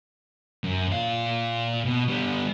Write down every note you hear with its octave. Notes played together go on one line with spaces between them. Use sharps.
F#2
A#2 F5
B2
G3 B3